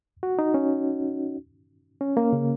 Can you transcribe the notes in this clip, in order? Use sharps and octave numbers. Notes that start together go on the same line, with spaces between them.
F#4
D#4
C#4
C#4
A#3
C#3